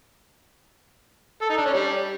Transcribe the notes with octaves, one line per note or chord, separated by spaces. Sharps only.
A4
D#4
D4
C#4
G3